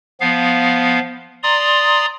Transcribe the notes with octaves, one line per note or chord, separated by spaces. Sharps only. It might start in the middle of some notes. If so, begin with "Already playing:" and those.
F3 B3 F5
D5 A#5 C6 D#6